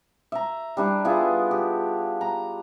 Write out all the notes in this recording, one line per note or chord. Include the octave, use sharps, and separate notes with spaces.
E5 A#5
G3 D4 E4
B3 E4 F4 G#4
G4
A#5